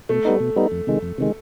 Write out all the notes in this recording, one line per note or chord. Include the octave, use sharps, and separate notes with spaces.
B2 A3
G3 B3 D#4
B2
G3 B3 D#4
F2
C3 D#3 G#3
F2
C3 D#3 G#3